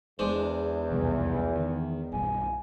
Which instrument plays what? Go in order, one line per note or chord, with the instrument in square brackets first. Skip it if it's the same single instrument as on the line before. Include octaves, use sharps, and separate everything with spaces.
[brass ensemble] E2 [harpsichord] G#3 D4 C5
[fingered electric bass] C2 F2 B2 [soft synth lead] E3
[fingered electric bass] D#3
[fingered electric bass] B1 G2 [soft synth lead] G#5